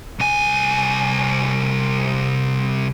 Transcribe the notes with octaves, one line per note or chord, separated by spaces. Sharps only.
C2 G#5